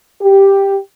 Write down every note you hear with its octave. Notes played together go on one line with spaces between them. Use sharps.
G4